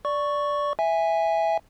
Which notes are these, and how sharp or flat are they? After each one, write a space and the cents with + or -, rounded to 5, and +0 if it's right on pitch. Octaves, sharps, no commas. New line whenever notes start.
D5 -5 C#6 +0
E5 +0 G#5 -10